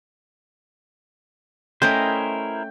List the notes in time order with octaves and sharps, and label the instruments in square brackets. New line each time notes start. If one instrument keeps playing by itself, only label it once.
[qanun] A3 C#4 D#5 [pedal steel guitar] E4 A#4 C5 [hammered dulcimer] G5 [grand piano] G6